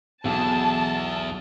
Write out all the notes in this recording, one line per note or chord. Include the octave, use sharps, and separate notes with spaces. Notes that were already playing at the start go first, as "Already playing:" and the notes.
B1 E2 A5